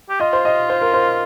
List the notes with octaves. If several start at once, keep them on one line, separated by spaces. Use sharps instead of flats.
G4
F4 D#5
C5
D#5
C5
A#4
C5